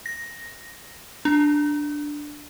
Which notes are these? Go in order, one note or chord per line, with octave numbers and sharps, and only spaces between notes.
A#6
D4